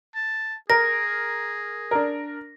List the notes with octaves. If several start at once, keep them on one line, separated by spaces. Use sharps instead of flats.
A5
G#4 A#4 A#6
D4 A#4